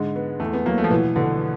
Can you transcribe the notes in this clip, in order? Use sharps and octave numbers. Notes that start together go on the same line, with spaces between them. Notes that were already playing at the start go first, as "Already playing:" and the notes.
Already playing: G#2 D3 G#3
B3
E2 A3
B3
F#3 A#3
A3
F3
B2 E3
B2 D3